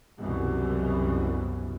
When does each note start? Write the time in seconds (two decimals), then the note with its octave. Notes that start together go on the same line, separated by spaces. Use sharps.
0.19 C2 F#2 B2 E3